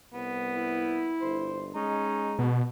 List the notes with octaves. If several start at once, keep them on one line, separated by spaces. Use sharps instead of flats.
C2 B3
E4
G1 C5
G#3 C#4 D#4
B2